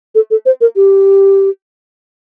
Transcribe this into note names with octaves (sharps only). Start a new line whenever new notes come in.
A4
A4
C5
A#4
G4